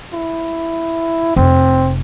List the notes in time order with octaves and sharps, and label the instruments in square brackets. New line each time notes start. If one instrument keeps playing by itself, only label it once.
[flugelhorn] E4
[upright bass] F1 [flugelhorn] C4